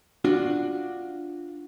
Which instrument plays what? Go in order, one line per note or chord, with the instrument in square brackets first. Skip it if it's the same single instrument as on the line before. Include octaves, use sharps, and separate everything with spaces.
[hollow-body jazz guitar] D4 F4 F#4